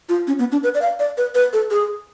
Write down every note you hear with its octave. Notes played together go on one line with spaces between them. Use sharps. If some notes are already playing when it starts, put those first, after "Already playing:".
F4
C#4
B3
D4
B4
D5
F5
D5
B4
B4
A4
G#4